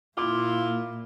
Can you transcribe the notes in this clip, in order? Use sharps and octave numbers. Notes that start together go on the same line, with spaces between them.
A#2 A#3 E4 F4 D6